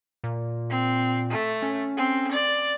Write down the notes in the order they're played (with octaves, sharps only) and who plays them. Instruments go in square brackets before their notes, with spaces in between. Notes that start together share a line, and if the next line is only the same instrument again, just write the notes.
[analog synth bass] A#2
[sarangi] C4
A3
[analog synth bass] C#4
[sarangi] C4
D5